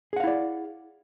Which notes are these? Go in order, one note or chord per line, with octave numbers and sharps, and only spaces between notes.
E4 G#4 D5 F5 F#5